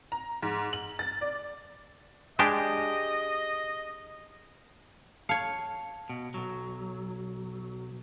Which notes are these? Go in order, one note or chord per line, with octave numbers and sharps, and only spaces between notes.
A#5
G#2
F#7
A6
D5
G#3 D4 G4 D#5
C#5 F5 A5 C#7
B2
B1 F#3